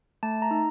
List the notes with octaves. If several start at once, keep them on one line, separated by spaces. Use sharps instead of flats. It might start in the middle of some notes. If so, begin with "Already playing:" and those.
A3 A5
A#5
D#4